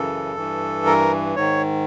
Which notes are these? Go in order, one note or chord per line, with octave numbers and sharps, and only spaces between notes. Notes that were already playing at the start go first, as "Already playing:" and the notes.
Already playing: F#2 C#3 E3 A4
G2 E3
A#4
G#2 D#3 C#5